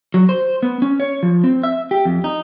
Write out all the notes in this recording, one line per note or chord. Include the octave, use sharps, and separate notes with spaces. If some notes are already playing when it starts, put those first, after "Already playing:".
F#3
C5
B3
C#4
C#5
F3
C4
E5
G4
F2
D#4